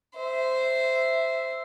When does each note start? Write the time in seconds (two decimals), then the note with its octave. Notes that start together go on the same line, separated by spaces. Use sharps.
0.16 C5 E5